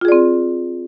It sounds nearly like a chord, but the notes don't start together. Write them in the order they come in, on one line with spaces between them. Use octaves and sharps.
F4 G#4 D5 C4